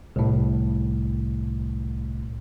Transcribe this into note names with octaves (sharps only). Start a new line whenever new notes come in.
C2 A2